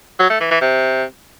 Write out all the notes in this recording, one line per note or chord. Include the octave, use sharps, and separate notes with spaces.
F#3
A3
E3
E3
C3